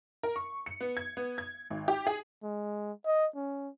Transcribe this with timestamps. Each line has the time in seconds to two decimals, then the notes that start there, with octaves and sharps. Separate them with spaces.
0.23 A#4
0.36 C#6
0.66 C#7
0.81 B3
0.97 G#6
1.17 B3
1.38 G#6
1.70 G#1
1.88 G4
2.07 G#4
2.43 G#3
3.06 D#5
3.36 C#4